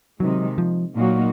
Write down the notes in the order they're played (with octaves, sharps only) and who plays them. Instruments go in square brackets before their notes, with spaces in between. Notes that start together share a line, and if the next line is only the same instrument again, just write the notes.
[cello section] C3 D#3 G#3 D#4 [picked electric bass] F#3
[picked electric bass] F3
[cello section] A#2 F#3 A#3 D#4 F#4